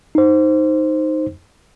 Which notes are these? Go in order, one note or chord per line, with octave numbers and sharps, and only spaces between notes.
D#4 C5